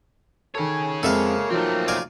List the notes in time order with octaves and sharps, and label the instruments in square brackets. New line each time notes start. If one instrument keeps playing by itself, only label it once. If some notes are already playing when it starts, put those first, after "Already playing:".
[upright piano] D#3 A4 [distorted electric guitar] G#4 C#5
[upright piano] F2 G#3 C4 [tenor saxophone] A#3 [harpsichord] A4 E5 F5
[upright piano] F3 F#3 D#4 [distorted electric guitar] A3 C4
[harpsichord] D5 F5 G#5